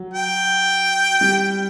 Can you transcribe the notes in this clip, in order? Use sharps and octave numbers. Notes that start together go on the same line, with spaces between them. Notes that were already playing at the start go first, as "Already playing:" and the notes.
Already playing: F#3
G5
G3